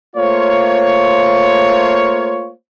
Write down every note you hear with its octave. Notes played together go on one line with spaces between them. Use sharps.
A3 A#3 F4 C5 C#5